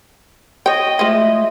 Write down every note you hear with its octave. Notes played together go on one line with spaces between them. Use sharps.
C#5 D#5 G5
F3 G#3 A3 E4